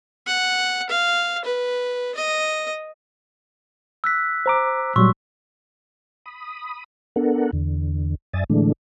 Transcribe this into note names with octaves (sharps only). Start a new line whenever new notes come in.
F#5
F5
B4
D#5
E6 F#6 B6
C5 A#5 D6
A#2 F#3 G3 C6 C#6 E6
B5 D#6
B3 D4 A4 A#4 F#5
E2 D3
F#2 D5 E5 G#5 D#6 A6
A2 D3 E3 G#3 A3 D4